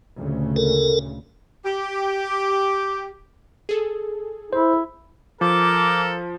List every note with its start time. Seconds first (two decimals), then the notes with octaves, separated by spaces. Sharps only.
0.17 D2 A#2 C#3
0.56 A4 A#4
1.66 G4
3.69 G#4 A4
4.53 E4 C5
5.41 F3 A4 A#4 D6